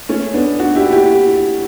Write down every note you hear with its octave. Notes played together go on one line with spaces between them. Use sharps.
A3 C#4
B3 D4
D4 F#4
E4 G4
E4 G4